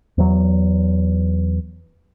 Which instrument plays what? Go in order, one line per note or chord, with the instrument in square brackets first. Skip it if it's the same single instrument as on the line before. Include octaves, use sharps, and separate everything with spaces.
[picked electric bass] E2 F#3